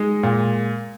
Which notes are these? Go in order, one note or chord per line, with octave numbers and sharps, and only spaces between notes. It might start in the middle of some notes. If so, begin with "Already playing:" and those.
Already playing: G#3 D#4
A#2